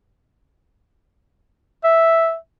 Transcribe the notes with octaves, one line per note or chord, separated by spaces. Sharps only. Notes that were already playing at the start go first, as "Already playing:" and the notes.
E5